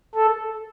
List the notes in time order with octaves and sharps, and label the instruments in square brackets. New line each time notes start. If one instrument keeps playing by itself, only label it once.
[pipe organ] A4